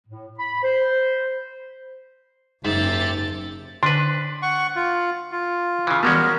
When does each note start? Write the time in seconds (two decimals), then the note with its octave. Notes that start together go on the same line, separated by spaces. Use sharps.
0.07 A2
0.38 B5
0.64 C5
2.64 F#1 G#2 G4 E5 A6
3.83 D3 D4 B4
4.42 F#5 C#6
4.76 F4
5.32 F4
5.87 C#3 E3
6.03 E3 G3 G#3 B3 C#4 F#4 A#4